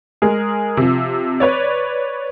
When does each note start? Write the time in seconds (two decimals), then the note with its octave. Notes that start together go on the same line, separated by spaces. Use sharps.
0.22 G#3 G#4 A#4
0.77 C3 F3
1.40 B4 C#5 D5